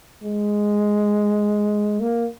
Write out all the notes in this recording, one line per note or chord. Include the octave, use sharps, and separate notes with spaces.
G#3
A#3